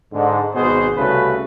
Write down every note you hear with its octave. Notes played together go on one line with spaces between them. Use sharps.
G#2 D3
G#1 B2 B3 G#4 C5
C2 C#3 A3 F#4 B4